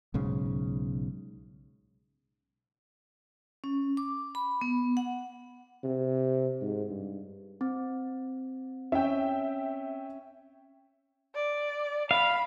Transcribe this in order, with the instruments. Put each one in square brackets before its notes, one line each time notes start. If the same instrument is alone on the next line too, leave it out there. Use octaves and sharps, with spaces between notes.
[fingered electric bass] B1 G#2 C#3
[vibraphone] C#4
D6
B5
B3
F#5
[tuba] C3
G#2
G2
[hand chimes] C4
[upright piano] C#4 [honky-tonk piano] E5 G5
[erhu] D5
[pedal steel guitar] F5 [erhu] B5